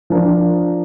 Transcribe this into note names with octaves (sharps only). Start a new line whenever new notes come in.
F3 D4 A#4